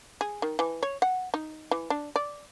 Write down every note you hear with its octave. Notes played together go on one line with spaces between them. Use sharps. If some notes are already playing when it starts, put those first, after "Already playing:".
G#4
D#3
E3
C#5
F#5
D#4
E3
D4
D5